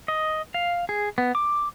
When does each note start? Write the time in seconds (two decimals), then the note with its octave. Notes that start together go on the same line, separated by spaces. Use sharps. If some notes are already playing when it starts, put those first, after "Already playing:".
0.08 D#5
0.54 F5
0.89 G#4
1.18 B3
1.35 D6